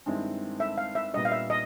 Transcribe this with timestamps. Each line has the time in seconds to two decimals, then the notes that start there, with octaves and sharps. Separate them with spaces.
0.06 G2 D#3 G#3 C4 E4
0.60 E5
0.78 F5
0.95 E5
1.14 A#2 G3 B3 D4 D#5
1.25 F5
1.32 E5
1.50 D#5